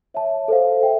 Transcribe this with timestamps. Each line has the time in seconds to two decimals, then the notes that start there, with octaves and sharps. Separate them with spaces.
0.14 C#5 E5 A5
0.48 A4 C5 F5
0.83 E5 G5